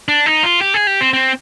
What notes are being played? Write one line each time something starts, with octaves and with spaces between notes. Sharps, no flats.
D4
D#4
F4
G4
G#4
G4
C4
C4